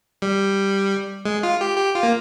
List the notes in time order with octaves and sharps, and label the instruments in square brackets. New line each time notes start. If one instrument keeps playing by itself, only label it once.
[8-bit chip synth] G3
G#3
F4
G4
G4
F4
A#3